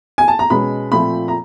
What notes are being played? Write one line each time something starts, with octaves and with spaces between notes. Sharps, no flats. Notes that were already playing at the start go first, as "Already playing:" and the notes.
G#5
A5
A#5
B2 G#3 C#4 B5
A#2 F3 A3 C4 B5
A#5